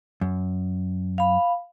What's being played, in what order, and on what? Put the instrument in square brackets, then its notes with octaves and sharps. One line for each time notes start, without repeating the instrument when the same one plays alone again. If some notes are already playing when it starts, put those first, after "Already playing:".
[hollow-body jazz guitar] F#2
[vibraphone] F5 B5